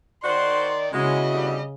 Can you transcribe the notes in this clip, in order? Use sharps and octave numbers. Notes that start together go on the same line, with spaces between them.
D#3 F#4 C5 D5 C6
C#3 G#3 B3 E4 F#4 D#5
D3 G3